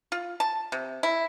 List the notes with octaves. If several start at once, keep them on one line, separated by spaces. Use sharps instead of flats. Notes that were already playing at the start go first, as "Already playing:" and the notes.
F4
A5
C3
E4